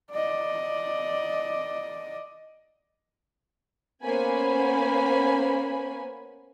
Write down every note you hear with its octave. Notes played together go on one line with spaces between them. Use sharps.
D5 D#5
A#3 B3 C#4 C5 G#5 B5